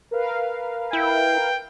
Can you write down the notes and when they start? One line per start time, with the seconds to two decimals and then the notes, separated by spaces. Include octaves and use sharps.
0.11 A#4 B4 F5
0.93 E4 G5